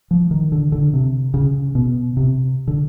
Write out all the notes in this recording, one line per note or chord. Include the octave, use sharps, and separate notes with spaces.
F3
D#3
D3
D3
C3
C#3
B2
C3
D3